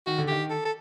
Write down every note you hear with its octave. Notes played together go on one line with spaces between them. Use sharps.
D#3 F#4
D3
D#3 G4
A4
A4